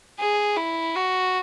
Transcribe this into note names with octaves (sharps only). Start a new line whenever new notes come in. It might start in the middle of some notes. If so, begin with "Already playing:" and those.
G#4
E4
F#4